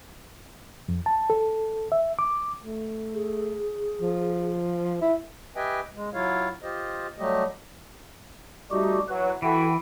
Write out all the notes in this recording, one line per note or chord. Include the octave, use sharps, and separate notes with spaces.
F2
A5
A4
E5
D6
A3
G#4
F3
E4 E5
G4 B4 D#5 E5 G5 G#5
G#3
F#3 E4 F4 C#5 F5
F4 G4 C5 D#5
F#3 G3 A3 G4 D#5
G3 A3 D#4 F#4 G4
E3 F#3 B4
E3 E4 F#4 A4 G5